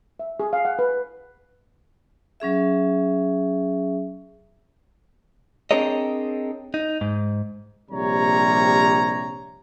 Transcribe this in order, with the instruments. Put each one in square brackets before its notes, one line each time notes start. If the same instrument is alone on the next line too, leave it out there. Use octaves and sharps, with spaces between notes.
[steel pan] E5
G#4
F5
F#5
B4
[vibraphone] F#3 C#4 G#4 E5
[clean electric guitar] C4 D4 G#4 A#4 C#5 D#5
D#4
G#2
[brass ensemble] A#1 C3 G3 C#5 A#5